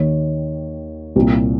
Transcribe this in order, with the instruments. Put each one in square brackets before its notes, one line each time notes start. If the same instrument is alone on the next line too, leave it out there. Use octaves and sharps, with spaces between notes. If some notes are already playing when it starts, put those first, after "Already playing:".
Already playing: [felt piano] D#2 D#3 C#5
C2 A#2